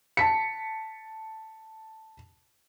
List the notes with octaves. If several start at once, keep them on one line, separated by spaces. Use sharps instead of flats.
A5 B6 C#7